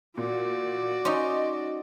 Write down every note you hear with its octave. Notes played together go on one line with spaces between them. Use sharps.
A#2 F#4 D5
C#4 D#4 D#5 C6